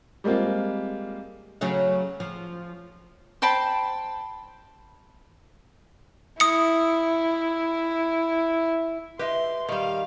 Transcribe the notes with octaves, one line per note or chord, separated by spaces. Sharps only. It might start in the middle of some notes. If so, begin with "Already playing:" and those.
G3 G#3 A#3 C4 F4
C#3 F#3 A3
F3
C5 G5 A5 B5
E4 D#6 C#7
G4 B4 D#5 E5 C6
D#3 G3 G4 F5